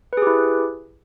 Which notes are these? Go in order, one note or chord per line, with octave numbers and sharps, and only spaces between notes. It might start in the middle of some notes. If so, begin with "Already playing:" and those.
E4 G4 G#4 B4